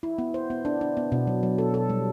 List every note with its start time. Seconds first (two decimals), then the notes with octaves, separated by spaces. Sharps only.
0.03 E4
0.18 B3
0.34 C5
0.50 B3
0.65 D4
0.81 D4
0.97 B3
1.12 B2
1.27 F#3
1.43 F#3
1.58 A4
1.74 A4
1.89 G3